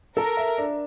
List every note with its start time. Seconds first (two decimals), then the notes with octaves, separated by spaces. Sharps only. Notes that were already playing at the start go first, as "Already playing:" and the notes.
0.16 A4 A#4
0.37 E5
0.58 D4